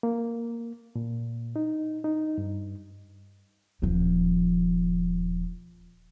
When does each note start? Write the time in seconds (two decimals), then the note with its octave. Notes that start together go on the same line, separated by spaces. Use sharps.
0.03 A#3
0.96 A#2
1.56 D#4
2.04 D#4
2.38 G2
3.82 D#1 F3